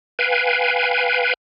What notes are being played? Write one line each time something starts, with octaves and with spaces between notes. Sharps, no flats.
B4 F5 G5 G#5